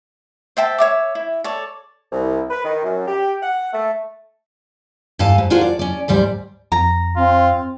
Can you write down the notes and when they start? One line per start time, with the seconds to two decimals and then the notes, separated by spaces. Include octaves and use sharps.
0.57 C5 E5 G5 A5
0.78 C#5 E5 D6
1.15 E4
1.44 A4 C#5 D5
2.12 C2
2.50 B4
2.64 D#3
2.83 F#2
3.07 G4
3.42 F#5
3.73 A3
5.19 G2 A4 F5 G#5 A5
5.38 G#2
5.50 D4 F4 F#4 G#4 A#4 C5
5.61 D5
5.79 C#4 D5
6.08 D2 G#2 G3 D5
6.72 F2 A#5
7.16 C4 F4